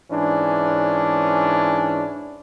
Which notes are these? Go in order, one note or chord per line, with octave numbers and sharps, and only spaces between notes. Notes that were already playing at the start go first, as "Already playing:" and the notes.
G#2 E3 C#4 D4